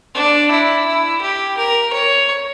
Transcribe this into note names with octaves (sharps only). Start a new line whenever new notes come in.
D4
E4
E4
G4
A#4
C#5